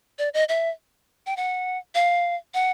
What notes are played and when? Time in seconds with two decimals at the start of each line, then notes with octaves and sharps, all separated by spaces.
0.19 D5
0.34 D#5
0.49 E5
1.26 G5
1.37 F#5
1.95 F5
2.54 F#5